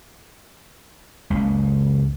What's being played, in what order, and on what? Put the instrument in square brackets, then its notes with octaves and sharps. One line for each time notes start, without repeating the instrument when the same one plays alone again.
[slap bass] F#1 C#2